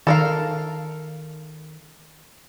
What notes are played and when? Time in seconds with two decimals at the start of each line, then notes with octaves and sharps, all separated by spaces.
0.07 D#3 A4 A#4 F5